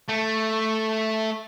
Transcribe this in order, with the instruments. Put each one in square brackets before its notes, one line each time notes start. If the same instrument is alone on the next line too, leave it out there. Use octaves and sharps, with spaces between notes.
[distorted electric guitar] A3